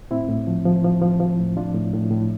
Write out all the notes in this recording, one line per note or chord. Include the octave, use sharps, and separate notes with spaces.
A2 C4 E4
A2
F3
F3
F3
F3
F3
A2
F3 D4 F4
A2
A2
A2